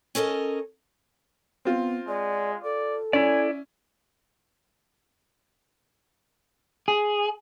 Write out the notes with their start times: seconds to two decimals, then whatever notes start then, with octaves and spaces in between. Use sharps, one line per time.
0.15 C#4 A4 A#4 D5 D#5
1.65 B3 C4 F4
2.08 G#3 D5
2.64 A4 D5
3.13 C#4 E4 D5 G#5
6.88 G#4